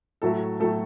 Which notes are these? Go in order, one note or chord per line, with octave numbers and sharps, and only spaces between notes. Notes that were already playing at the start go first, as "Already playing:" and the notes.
A2 F#3 A3 A4
A2 F#3 A3 A4